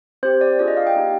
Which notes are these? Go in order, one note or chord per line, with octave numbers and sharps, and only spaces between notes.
C4 G4 C5
D5
D4 F4 G#4 D5
D#5
F5
G5
A#3 D#4 G4